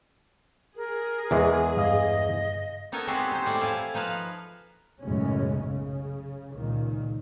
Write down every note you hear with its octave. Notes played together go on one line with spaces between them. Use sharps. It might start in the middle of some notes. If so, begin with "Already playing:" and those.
G#4 A#4
E2 E3 G#3
G2 D#5 F5 D#6
B3 D#4 A4 A#4 C#5
G#3 B3 C4 F#4 G4
D#4 C5
A2 G3 D5
E4 F5 G#5 A5
F3 D#4 B4 F5
B1 F#2 A2 C#3 G#3 C#4
C#3
C#2 A#2 D#3